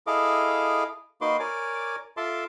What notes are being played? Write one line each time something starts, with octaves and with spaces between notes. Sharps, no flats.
E4 G#4 A4 D#5 F5 D6
A#3 D#4 F#4 B4 C6 D6
A#4 C#5 D5 G#5 D6
F4 A4 E5 A5 C6 D6